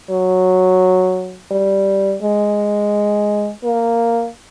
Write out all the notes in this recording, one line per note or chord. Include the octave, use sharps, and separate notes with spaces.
F#3
G3
G#3
A#3